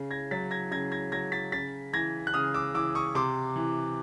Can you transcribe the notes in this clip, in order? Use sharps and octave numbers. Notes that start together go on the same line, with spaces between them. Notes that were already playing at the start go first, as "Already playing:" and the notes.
Already playing: C#3
G#6 A#6
F#3 A6 B6
G#6 A#6
C#3 G#6 A#6
G#6 A#6
F#3 G#6 A#6
A6 B6
C#3 A6 B6
E3 G#6 A#6
F#6
C#3 D#6 F6
D6 E6
E3 D6 E6
C#6 D#6
C3 C6 D6
E3